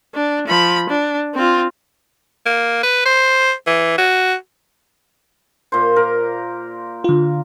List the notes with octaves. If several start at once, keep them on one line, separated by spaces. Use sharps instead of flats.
D4
F3 B5
D4
C4 F4
A#3
B4
C5
E3
F#4
A#2 C5
A#4
D3 F4